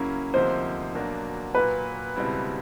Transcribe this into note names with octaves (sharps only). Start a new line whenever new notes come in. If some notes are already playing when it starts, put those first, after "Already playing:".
Already playing: C#3 F#3 A#3 C#4 E4
D2 C3 F3 A#3 D#4 C5
B2 F#3 A#3 D4
A#2 F#3 A#3 B4
C#2 B2 G3 C4 E4